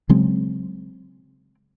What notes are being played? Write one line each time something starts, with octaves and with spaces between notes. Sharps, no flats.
C#3 F#3 G#3 C4